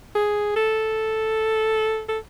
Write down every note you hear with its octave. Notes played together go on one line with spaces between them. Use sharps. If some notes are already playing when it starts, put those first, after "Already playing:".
G#4
A4
A4